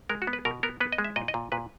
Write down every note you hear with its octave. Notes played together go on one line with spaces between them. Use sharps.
G#3 A#4
F#4
B3
B4
B2 A#4
B3 A#4
B3 B4
D#5
G#3
E5
A#2 D#5
D#5
A#2
A#2 B4